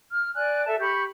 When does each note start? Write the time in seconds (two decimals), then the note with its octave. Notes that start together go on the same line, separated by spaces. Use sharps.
0.13 F6
0.36 D5 G#5 F#6
0.67 A4 E5 A5
0.80 G4 B5 C#6